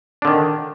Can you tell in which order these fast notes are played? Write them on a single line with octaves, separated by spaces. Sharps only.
D4 D3 D#3